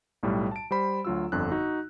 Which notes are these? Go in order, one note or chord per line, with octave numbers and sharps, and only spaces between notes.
B1 A2 G3
A5 D7
G3 C5 B5
D2 F#3 F4 F#4 E6
G1 F2 D3 F#6
D#4 F#4